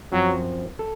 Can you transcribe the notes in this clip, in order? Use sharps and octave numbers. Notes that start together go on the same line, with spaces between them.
F#2 F3 F#3 C4
A4